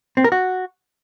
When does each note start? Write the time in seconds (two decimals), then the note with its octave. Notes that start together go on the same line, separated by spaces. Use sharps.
0.17 C4
0.24 A#4
0.32 F#4